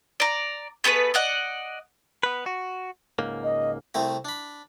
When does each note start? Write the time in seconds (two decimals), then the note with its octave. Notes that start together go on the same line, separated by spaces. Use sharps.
0.20 D5 A#5
0.84 A3 B3 G#4 B4
1.14 D5 D#5 F#5
2.23 B3 B4
2.46 F#4
3.19 C#2 G#2 A#3
3.44 D#5
3.94 C2 A3 C4 A#5
4.25 D4 B5